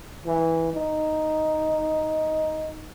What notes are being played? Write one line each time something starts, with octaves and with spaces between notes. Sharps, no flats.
E3
D#4